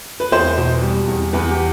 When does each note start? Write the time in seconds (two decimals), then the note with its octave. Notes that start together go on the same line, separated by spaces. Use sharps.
0.20 B4
0.32 E2 C5
0.58 B2
0.82 G3
1.07 E2
1.33 E2 B4
1.50 G4